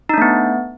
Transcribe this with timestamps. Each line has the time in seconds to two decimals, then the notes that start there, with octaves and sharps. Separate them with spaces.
0.09 D#4
0.14 D4
0.18 A3
0.22 B3